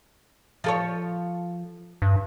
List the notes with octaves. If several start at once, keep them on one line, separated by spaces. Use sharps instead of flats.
F3 A4 C#5
G2